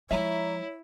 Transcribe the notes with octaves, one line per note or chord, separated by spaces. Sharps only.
F3 G#3 E4 C#5 E5 A#5